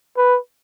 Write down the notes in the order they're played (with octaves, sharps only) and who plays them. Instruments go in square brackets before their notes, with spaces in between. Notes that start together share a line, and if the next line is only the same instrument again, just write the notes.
[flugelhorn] B4